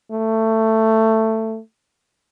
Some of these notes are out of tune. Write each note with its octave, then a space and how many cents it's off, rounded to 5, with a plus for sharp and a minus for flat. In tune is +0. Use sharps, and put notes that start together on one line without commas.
A3 +15